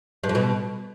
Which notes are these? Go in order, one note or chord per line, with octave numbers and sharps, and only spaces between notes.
G2
F2
B2